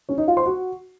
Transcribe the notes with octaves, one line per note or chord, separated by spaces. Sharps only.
C#4 C#5
D#4 D#5
F4 F5
C5 C6
F#4 F#5